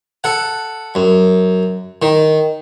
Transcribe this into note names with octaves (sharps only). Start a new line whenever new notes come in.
A4 F#5
F#2
D#3